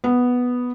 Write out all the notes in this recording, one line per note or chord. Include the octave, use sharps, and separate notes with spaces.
B3